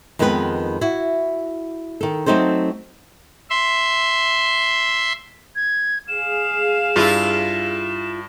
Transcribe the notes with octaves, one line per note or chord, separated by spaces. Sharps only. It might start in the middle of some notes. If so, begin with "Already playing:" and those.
F2 D#3 G#3 B3 A4 B4
E4 F#4
D#3 A4
F#3 A3 C4 D#4 A4 C5
E5 C6
G#6
G#4 F5 E7
G2 E4 F4